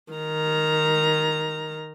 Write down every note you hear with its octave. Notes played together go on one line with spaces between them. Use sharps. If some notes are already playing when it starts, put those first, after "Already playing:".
D#3 A#5